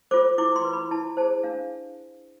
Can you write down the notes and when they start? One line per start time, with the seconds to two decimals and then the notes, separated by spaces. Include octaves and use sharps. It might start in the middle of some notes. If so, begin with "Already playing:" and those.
0.11 F4 A4 C5 D6
0.38 E4 D6
0.56 C6
0.65 B4
0.73 B5
0.91 E4 A5
1.17 G#4 C5 A5
1.43 D4 F5